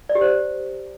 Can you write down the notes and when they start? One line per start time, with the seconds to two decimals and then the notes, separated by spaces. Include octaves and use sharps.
0.09 D5
0.15 G4
0.21 C5